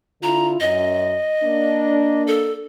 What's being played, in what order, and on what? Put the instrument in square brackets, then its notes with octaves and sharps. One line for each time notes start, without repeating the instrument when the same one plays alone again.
[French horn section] D3 E4 F4 [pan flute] A#5
[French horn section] F#2 [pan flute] D#5
[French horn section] A#3 D4
[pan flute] A4